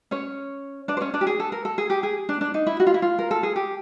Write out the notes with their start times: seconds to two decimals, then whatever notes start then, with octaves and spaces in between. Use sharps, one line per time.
0.11 C#4 C#5
0.88 D4 D5
0.97 C5
1.01 C#4 C#5
1.14 D4 D5
1.21 G4
1.27 G#4
1.40 A4
1.52 A#4
1.65 A4
1.78 G#4
1.90 G4
2.03 G#4
2.29 D4
2.41 D4
2.54 D#4
2.67 E4
2.80 F#4
2.87 F4
2.94 E4
3.02 F4
3.19 A#4
3.31 A4
3.43 G#4
3.56 G4